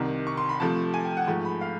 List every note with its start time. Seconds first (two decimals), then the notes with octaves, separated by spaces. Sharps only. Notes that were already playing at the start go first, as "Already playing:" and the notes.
Already playing: C2 C3 D#3
0.27 C#6
0.37 C6
0.49 B5
0.60 C3 F3 A3 A5
0.94 G#5
1.05 G5
1.17 F#5
1.27 G#2 F3 A3
1.45 B5
1.61 F5